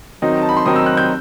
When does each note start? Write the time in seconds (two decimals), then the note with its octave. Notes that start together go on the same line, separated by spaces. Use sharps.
0.22 D#3 F#3 C4 D#4
0.42 A5
0.49 B5
0.57 C6
0.66 D#3 F#3 C4 D#4 D#6
0.76 E6
0.86 F#6
0.97 G6